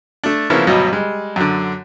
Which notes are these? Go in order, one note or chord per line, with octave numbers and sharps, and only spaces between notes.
A3 D4
C#3 F3 A#3 B3 C#4 E4
D2 G2 B2 F#3 D#5
G3 G#3
F#2 D3